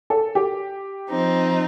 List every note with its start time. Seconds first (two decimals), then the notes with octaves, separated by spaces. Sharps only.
0.10 A4
0.35 G4
1.11 F3 C4 D#4